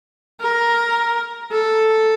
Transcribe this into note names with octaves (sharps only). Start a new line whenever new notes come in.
A#4
A4